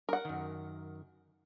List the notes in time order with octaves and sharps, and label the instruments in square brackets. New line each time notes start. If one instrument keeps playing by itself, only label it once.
[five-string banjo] A#4 F#5
[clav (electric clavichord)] F#2 D#3